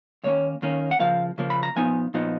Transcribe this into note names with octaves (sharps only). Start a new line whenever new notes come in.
D#2 D#3 A#3 C#4 C#5
D#2 D#3 A#3 C#4
F#5
C#3 F3 A#3 F5
C#3 F3 A#3
B5
A#5
A#2 F3 B3 D#4 G#5
A#2 F3 B3 D#4